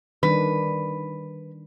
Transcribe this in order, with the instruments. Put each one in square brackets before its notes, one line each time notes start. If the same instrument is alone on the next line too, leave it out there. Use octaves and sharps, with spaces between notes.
[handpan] D#3 G3 D4 [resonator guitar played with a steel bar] B4